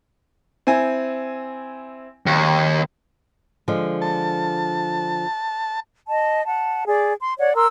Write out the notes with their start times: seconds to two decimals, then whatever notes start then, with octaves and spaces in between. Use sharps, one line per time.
0.67 C4 E4 G#5
2.26 D#2
3.68 D3 F3 G#3
4.02 A5
6.08 D#5 A5
6.45 F#5 A5
6.86 G#4 D5
7.19 C6
7.38 C#5 D5 F#5
7.55 A#4 C6 E6